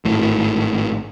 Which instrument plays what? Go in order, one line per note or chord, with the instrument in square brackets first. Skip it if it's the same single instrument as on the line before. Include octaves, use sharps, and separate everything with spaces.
[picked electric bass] G#1 A2